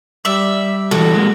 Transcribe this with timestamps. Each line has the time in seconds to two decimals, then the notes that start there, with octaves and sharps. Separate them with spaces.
0.25 G3 D5 E5
0.91 E3 G3 F#4 A4
1.15 G#3 A#3